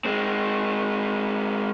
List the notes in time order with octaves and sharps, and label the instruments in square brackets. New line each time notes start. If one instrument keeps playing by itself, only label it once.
[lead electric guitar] G#3 C4